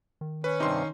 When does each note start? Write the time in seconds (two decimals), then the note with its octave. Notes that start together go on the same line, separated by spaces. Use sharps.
0.21 D#3
0.44 C#4 B4
0.60 G2 C3 D#4 C6